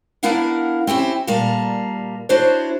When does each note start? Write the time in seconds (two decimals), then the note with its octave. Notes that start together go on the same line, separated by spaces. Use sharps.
0.23 B3 D4 E4 A#4 F5 F#5
0.87 C4 C#4 E4 G4
1.27 A#2 G3 A#4 F5 A5
2.29 D4 E4 F#4 C5 C#5